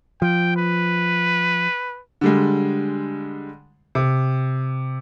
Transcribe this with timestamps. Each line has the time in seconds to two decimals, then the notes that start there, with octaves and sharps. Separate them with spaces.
0.22 F3 G5
0.57 B4
2.21 D3 G3 G#3
3.95 C3